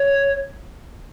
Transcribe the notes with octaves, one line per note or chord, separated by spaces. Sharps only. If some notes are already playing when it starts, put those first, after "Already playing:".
Already playing: C#5